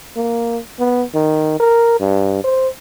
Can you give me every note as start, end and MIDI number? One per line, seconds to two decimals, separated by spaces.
0.17 0.59 58
0.79 1.03 59
1.15 1.55 51
1.60 1.97 70
2.00 2.41 43
2.44 2.69 72